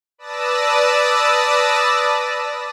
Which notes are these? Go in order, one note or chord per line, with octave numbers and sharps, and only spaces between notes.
B4 D5 A5 D#6 E6 A#6